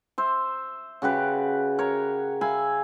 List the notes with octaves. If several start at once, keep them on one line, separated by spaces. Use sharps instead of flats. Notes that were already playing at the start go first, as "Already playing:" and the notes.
C5 E5
C#3 F#4 G4 B4
A#4 C#5
E5 F5 G#5 B5